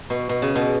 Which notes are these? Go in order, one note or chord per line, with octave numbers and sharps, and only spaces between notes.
B2
B2
C#3
B2